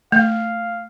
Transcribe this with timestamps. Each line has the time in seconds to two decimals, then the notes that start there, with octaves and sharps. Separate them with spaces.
0.12 A3 F5